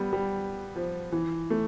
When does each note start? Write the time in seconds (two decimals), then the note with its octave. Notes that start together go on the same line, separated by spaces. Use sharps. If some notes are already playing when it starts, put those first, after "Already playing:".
Already playing: G3 B3
0.13 G3
0.76 F3
1.12 E3
1.50 A3